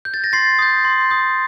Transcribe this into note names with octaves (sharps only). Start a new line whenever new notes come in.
G6
A6
A#6
C6 A6 C7
D#6 G6
C6
D#6 G6